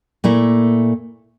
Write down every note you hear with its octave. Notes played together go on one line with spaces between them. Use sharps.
A#2 A3 A#3 E4